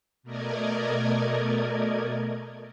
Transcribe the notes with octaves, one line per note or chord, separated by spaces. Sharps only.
B2 A3 A#4 D5 D#5 G#6